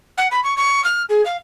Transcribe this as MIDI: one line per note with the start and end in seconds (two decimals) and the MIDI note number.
0.18 0.28 78
0.31 0.43 83
0.44 0.55 85
0.57 0.84 85
0.84 1.03 89
1.09 1.24 68
1.25 1.37 77